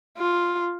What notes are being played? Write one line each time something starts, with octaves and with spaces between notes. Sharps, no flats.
F4